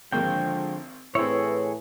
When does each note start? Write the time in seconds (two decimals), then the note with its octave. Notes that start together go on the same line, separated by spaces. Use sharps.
0.12 G#1 D3 F3 G#3 A#3 G5
1.15 A2 E3 C4 E4 G#4 B4 C#5